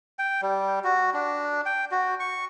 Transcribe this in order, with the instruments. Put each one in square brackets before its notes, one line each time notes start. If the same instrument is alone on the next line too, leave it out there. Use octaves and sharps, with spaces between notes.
[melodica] G5
G3
F#4
D4
G5
F#4
C#6